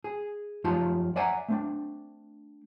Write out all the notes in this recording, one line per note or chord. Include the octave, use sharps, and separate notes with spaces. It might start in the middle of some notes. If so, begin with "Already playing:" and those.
G#4
F#2 F3 D#4 F4 G4 A5
D5 E5 F#5 G#5 A#5
A3 C4 D4